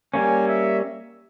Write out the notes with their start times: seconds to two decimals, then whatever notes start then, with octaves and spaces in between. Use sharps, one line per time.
0.14 G3 A#3 C#4 G#5
0.48 E5